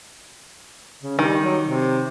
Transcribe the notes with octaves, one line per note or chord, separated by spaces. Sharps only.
C#3
D#3 G3
F#3
C3